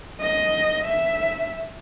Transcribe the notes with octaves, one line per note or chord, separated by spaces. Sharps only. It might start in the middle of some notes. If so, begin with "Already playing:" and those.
D#5
E5